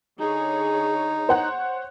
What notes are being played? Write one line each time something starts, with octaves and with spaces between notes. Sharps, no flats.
D3 D#4 G#4 C#5
C5 C#5 F#5 F#6